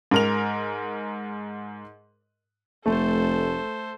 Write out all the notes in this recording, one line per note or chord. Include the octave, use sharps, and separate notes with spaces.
G#2 A#4 F7
F1 A3 A4 C5